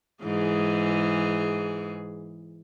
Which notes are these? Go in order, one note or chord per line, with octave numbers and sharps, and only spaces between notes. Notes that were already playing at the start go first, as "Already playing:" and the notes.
G#2 E3 G#4